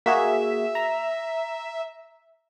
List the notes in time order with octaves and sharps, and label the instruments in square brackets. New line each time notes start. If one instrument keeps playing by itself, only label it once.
[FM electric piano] A#3 F#4 G#4 [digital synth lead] E5
[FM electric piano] A#5